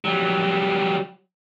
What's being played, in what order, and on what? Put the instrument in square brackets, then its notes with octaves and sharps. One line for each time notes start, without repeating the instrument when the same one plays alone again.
[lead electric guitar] F#3 G3